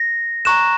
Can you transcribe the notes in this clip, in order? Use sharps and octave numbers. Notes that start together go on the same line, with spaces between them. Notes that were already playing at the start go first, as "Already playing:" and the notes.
Already playing: A#6
A#5 C#6 F#6 E7